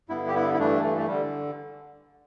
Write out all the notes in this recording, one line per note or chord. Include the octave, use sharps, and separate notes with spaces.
G2 D3 B3 E4
G4
B3 E4
E4
G2 E3 A3 D4
A3
A3
D3 G3